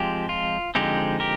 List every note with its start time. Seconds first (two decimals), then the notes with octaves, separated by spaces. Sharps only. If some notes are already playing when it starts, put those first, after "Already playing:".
Already playing: F3 G#3 C4 G4
0.29 F4
0.75 D3 F3 G#3 C4 D#4 G4
1.20 G4 A#4